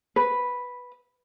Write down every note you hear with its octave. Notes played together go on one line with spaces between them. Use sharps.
B4